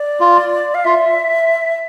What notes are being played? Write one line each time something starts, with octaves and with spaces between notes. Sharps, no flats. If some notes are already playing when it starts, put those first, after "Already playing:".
Already playing: D5
F4
F5
F4 E5